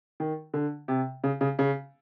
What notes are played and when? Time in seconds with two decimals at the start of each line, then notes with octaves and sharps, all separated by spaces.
0.20 D#3
0.54 D3
0.88 C3
1.24 C#3
1.41 C#3
1.59 C#3